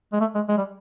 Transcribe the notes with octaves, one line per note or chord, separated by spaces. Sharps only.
G#3
A3
G#3
G#3
G3